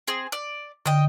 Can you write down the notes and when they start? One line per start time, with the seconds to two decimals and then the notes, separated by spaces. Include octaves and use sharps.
0.08 C4 G#4
0.32 D5
0.86 D3 D#5 G5